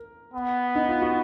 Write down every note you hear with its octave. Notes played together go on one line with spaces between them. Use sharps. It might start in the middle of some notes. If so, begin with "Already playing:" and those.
Already playing: A#4
B3
D#4
F4
F#4